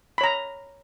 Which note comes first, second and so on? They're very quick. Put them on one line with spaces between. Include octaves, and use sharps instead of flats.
B5 C#5 A#5